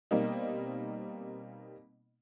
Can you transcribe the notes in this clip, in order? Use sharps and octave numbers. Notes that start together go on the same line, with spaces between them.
B2 G3 A#3 C4 D#4